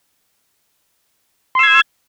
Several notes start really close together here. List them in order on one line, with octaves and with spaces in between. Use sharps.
C6 E6 G#6